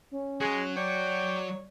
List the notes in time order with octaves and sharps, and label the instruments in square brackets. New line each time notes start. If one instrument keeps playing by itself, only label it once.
[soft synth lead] C#4
[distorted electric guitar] F#3 F#4 [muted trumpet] G#3 [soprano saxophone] G#4
[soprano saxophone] C#5 [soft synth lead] D5 [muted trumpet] G5